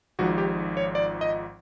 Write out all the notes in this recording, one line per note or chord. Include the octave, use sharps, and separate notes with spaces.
G#1 G#2 F3 F#4
G4
C#5
D5
D#5